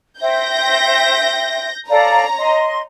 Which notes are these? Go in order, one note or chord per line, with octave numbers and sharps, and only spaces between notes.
C5 E5 G5 G6 A#6
A4 C#5 D5 F5 A#5
D#5 C6